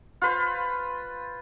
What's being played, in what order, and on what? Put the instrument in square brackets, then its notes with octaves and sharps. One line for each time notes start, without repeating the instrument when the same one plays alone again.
[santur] F4 B4 C5